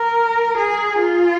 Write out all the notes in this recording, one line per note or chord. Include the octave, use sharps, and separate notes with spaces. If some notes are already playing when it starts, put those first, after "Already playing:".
Already playing: A#4
G#4
F4